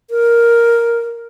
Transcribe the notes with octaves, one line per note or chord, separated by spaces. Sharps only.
A#4